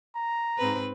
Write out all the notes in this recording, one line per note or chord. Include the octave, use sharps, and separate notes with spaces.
A#5
G#2 C4 B4